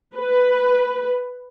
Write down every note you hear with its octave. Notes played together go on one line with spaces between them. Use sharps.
B4